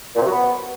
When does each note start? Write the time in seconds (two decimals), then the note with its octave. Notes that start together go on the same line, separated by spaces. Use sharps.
0.16 A#2
0.21 C3
0.26 F#3
0.31 B3